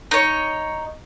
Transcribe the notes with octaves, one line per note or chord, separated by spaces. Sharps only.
D#4 C#5